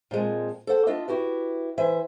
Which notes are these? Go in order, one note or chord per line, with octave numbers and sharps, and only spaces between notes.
A#2 F3 G#3 C4
A4 C5 F#5
D4 F4 D#5 E5
E4 F#4 G4 B4
E3 C5 E5